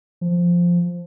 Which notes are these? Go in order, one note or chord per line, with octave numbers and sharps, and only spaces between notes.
F3